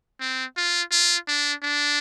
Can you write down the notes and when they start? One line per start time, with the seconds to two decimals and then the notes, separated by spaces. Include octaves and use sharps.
0.20 C4
0.57 F4
0.91 F4
1.28 D4
1.63 D4